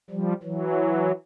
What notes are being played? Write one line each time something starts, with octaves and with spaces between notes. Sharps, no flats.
F3 G3
E3 F#3